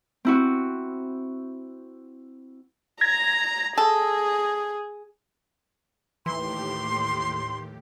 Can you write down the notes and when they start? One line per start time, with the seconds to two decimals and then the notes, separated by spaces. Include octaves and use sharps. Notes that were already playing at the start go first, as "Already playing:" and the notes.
0.25 C4 E4 F#4
3.01 A#5 G#6 A#6
3.78 G#4 A4
6.26 D#2 A2 E3 G4 C6